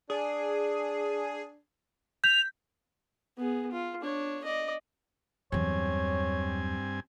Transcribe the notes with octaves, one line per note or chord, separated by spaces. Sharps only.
D4 G#4
G6 B6 F7
B3 G#4
F4
D4 C#5
D5 D#5
E2 G2 F#3 C4 C#5 G#5